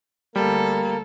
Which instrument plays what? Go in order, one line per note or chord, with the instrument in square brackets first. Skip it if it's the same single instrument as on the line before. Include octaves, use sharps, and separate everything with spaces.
[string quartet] D2 A4 [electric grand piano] G3 [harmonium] A#3 A#4